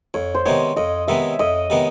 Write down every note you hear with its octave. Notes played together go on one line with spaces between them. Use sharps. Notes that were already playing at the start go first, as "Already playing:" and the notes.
F2 C#5
C5
C3 D#3 G#3 B3 C#5
F2 D#5
C3 D#3 G#3 B3 E5
F2 D#5
C3 D#3 G#3 B3